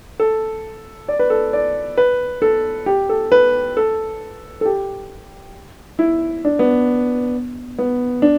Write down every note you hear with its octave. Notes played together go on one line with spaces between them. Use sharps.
A4
D5
B4
A4
D5
B4
A4
G4
A4
B4
A4
A4
G4
E4
D4
B3
B3
D4